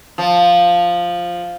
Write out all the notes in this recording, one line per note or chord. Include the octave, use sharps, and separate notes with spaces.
F3